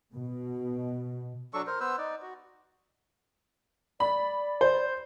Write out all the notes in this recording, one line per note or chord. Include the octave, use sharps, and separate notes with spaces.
B2
F#3 D4 A4 C#6
A#4 C5
B3 B4 C5 E6
D#4 D5
F#4
D5 B5
C5